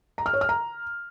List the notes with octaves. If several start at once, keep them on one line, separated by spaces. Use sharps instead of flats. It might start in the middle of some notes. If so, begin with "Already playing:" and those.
A#5
F6
C#5
F6
A#5